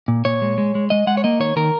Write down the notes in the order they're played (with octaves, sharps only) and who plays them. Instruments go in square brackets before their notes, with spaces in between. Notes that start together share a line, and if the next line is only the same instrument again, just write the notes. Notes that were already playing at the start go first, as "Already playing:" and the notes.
[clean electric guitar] A#2
A#2 C#5
G#3
G#3
G#3
G#3 D#5
G#3 F#5
C#5
A#3 D#5
D#3 C#5
D#3 A#4